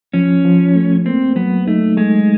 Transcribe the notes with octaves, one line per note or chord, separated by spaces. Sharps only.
F3 C#4
F3
A3
A#3 C4
F#3 B3
A3 D#4
G#3 A3